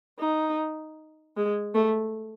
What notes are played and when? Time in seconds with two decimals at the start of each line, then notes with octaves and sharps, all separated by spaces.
0.19 D#4
1.37 G#3
1.74 A3